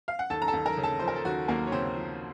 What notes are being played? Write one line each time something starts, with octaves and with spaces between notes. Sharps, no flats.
F5
F#5
D#2 A4 A5
A#5
A4 A5
D#2
A#4 A#5
C#3
A4 A5
F3 C5
A#4
A4
D#2 F#4
D#2 A#3 A#4
C#5
C#3 C4 C5
F3